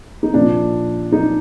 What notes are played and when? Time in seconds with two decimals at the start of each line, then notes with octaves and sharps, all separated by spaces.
0.23 D#4
0.34 A#2 F3 D4
1.12 D#4